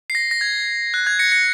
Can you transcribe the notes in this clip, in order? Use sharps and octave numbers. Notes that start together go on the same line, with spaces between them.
C7
A#6
A#6
G#6
F#6
G#6
A#6 C#7
A#6 C#7